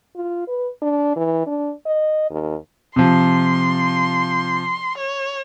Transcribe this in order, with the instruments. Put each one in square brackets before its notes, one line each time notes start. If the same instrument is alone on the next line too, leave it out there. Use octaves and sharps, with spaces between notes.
[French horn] F4
B4
D4
E3
D4
D#5
D#2
[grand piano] C3 F3 [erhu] C6
[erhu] C#5